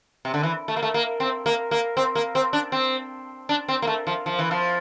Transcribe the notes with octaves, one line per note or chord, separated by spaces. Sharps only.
C3
D3
E3
A3
A#3
A3
A#3
C4
A#3
A#3
C4
A#3
C4
D4
C4
D4
C4
A#3
A3
F3
F3
E3
F3